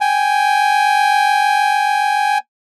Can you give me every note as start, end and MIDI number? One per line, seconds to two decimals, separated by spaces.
0.01 2.38 79
0.01 2.38 80